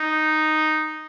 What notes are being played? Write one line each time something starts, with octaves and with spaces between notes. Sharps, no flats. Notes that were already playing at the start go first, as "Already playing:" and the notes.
Already playing: D#4